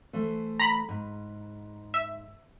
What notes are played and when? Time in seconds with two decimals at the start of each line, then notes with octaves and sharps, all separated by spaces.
0.13 E3 A3 C5
0.60 A#5 B5
0.89 G#2
1.94 E5